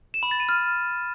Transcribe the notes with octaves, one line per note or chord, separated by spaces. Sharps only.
E7
B5
A6
D#7
F6